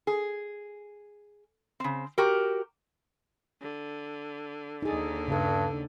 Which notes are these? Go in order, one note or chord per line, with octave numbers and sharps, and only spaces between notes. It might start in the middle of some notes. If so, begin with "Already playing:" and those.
G#4
C#3 C4
F#4 G4 A#4
D3
D#2 D3 D#4 G#4
G2 C#3 D4 A4